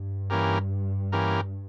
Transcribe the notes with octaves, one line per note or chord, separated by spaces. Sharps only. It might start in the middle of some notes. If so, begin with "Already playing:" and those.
Already playing: G2
E3 A#3 C#4 G4 A#4
E3 A#3 C#4 G4 A#4